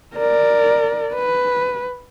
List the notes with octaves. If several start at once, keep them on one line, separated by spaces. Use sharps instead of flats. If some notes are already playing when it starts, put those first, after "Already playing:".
A#4 D5
B4